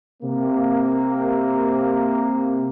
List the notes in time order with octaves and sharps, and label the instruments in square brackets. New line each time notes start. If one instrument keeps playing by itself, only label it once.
[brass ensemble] C3 A#3